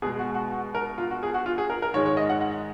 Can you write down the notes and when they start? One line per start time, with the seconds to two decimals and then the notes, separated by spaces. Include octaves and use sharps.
0.02 B2 G#3 G#4
0.19 F#4
0.35 F#4
0.51 F#4
0.75 A#4
0.98 F4
1.11 F#4
1.23 G#4
1.34 F#4
1.46 F4
1.58 G#4
1.70 A#4
1.82 A#4
1.94 G#2 D#3 G#3 C#5
2.06 C#5
2.17 D#5
2.30 F#5
2.41 F#5